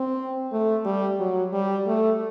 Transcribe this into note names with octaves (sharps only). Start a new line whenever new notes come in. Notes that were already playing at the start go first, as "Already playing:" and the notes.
Already playing: C4
A3
G3
F#3
G3
A3